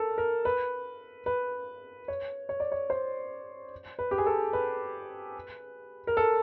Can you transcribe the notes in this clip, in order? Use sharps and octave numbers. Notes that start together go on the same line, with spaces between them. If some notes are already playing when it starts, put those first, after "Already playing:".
Already playing: A4 A#4
A#4
B4
B4
C#5
C#5
D5
C#5
C5
B4
G4
G#4
A4
B4
A#4
A4